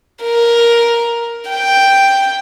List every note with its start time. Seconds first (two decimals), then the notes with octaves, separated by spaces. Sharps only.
0.24 A#4
1.50 G5